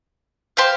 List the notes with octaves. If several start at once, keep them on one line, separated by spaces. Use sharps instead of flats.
G4 C5 F5